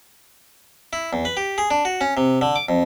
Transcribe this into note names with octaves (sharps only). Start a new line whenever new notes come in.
E4
E2
B4
G4
G#4
D4
F#4
C#4
C3
D3
D6
F2